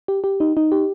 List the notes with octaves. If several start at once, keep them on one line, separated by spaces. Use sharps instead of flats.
G4
G4
D#4
D#4
G4